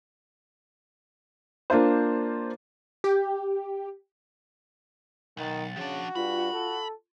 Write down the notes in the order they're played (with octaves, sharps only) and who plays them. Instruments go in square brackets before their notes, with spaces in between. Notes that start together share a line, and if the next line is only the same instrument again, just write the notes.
[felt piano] A#3 D4 F4 C5
[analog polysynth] G4
[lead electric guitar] B1 [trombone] D#3 [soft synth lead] A6
[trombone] C#3 [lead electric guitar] F3 D4 [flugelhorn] F#4
[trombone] G2 [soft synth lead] F4 [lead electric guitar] B5
[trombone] A4